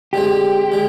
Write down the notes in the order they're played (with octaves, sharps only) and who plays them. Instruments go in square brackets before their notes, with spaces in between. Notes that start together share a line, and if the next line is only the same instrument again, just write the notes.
[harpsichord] D3 G#3 C4 [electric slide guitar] G4
[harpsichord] D3 G#3